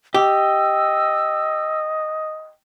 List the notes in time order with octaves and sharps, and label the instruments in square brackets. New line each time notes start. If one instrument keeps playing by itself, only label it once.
[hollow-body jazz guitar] G4 [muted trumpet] D#5 [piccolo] E6